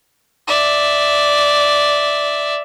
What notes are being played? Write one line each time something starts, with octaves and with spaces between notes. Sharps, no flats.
D5 E5